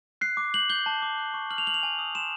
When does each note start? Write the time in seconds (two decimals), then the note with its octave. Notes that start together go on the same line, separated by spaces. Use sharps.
0.21 F#6 C7
0.37 D6
0.54 G6 F#7
0.70 G6 G7
0.86 A5
1.02 D6
1.18 F#6
1.34 C#6
1.50 F6 F#7
1.58 F7
1.66 F6 F#7
1.74 F7
1.83 G#5
1.99 D#6
2.15 C6 E7